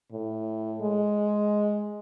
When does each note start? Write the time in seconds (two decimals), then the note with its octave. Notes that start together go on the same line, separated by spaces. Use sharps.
0.12 A2
0.81 G#3